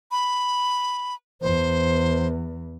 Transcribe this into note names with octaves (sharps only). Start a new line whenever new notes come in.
B5
E2 C5